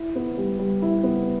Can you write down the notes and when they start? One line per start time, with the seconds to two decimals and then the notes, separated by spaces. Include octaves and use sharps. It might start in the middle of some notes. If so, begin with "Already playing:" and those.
Already playing: E4
0.15 B3
0.37 G3
0.59 G3
0.82 E4
1.04 B3